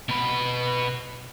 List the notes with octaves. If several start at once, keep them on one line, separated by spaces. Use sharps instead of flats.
B2 B4